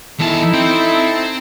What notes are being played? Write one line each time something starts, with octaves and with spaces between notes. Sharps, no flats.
E2 D#4 E4 A4 A5
C4 G5